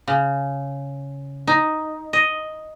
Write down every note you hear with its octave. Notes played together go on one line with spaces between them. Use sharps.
C#3
D#4
D#5